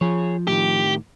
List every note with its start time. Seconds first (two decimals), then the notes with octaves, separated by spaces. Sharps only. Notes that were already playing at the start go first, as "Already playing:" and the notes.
0.01 F3 G#4 C#5
0.47 A2 D#3 G4